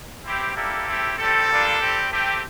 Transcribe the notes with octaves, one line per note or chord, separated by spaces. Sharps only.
C4 E4 G4
G3 A#3 E4 G4 A4
C4 E4 G4
G3 C4 G4 A4
G3 A#3 D4 F4
G3 C4 G4
A3 C4 G4